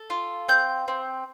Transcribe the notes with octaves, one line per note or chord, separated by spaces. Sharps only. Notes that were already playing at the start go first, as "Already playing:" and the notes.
Already playing: A4
F4
C4 G6
C4